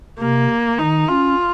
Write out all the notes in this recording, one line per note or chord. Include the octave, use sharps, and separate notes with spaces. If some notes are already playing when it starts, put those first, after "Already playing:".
C3 A#3
D#3 D#4
C#4 F4